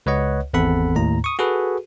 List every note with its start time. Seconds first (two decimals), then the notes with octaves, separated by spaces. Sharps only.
0.06 C#2 B4 C#5 D#5 F#5
0.53 G#1 E2 C4 A4 F#5 B5
0.96 D#2 A2 A#5
1.24 C#6 D#6
1.39 F#4 G#4 A4 B4